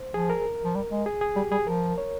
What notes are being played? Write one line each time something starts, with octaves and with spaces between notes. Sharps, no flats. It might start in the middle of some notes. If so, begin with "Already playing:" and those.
Already playing: C5
F3 G#4
A#4
F3
G3
G#3
G#4
G#4
G3 G4
G3 G#4
F3 A#4
C#5